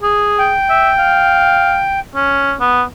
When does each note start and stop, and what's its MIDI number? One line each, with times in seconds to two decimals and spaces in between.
0.03 0.53 68
0.38 1.99 79
0.70 0.91 76
0.98 1.80 77
2.15 2.54 61
2.60 2.83 59